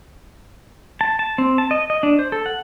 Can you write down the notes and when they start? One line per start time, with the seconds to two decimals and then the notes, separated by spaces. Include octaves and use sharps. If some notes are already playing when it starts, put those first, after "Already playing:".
1.01 A5
1.19 A5
1.38 C4
1.58 A5
1.71 D#5
1.90 D#5
2.03 D4
2.19 C5
2.32 A4
2.46 F#5